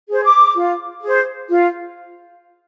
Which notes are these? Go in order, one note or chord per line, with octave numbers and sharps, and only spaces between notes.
G#4 C5
D6
F4
G#4 C5
F4